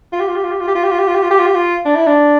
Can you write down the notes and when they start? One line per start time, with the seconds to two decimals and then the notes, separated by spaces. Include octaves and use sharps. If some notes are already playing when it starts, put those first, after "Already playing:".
0.12 F4
0.20 G4
0.28 F4
0.36 G4
0.44 F4
0.51 G4
0.60 F4
0.67 G4
0.75 F4
0.83 G4
0.91 F4
0.99 G4
1.08 F4
1.15 G4
1.23 F4
1.31 G4
1.39 F4
1.46 G4
1.55 F4
1.85 D4
1.96 E4
2.06 D4